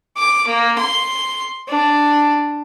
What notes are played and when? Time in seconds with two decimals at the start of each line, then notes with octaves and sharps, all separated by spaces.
0.17 D6
0.47 A#3
0.78 C6
1.68 D4